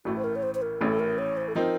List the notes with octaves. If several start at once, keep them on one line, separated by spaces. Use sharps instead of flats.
A1 A2 A3 F#4
C5
A#4
C#5
C5
C5
A#4
A1 A2 A3 C#4 A4
A#4
C#5
C5
A4
F3 C4 D#4 A#4